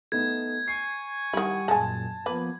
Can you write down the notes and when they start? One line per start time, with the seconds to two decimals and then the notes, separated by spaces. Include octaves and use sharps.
0.12 A3 B3 D#4 G#6
0.68 G#5 C#6 C7
1.33 D#3 G3 E4 F#5
1.68 F#2 A#2 G#3 G#5 A5
2.26 F3 A#3 B3 B4